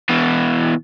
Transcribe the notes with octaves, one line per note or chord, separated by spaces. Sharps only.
B2 E3